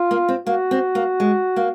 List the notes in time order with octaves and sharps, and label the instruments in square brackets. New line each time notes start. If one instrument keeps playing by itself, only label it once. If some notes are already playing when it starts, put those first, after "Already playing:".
Already playing: [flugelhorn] F4
[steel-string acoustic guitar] A#3
C4
[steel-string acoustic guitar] A#3 [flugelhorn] F#4
[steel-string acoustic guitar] C4
A#3
G#3
A#3